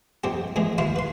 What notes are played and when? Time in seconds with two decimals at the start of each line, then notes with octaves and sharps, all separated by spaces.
0.24 A#1 F2 C4 G4
0.56 A2 E3 F3 G#3 A#3
0.78 D#2 F3 E4 F5 C6 C#6
0.96 B4 C6